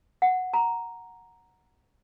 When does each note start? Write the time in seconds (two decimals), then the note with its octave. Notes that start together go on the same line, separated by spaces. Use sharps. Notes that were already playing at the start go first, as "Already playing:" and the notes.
0.22 F#5
0.53 A#5